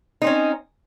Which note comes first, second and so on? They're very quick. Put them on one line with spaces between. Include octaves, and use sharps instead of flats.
D#4 C4 C#4